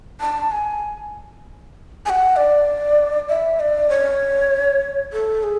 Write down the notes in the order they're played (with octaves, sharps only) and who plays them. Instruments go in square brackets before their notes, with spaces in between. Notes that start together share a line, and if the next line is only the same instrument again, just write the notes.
[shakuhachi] A5
G#5
G#5
F#5
D5
E5
D5
C#5
A4
G#4